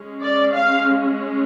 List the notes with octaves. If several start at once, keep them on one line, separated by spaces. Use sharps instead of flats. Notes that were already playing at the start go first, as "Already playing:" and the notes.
Already playing: G#3 C#4
D5
F5